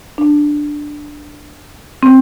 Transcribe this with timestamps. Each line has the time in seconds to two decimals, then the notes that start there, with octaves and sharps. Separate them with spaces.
0.18 D4
2.03 C4